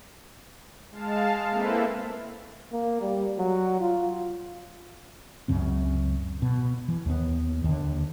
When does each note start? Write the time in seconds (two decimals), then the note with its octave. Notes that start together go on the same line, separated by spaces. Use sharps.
0.91 G#3 F5 A5
1.50 A#3 C4 E4 A4 B4 E5
2.72 A#3
3.01 G3
3.39 F#3
3.80 F4
5.48 C#2 F#2 C#3 C4
6.42 B2
6.88 E3
7.06 D#2 B3
7.64 D#2 D3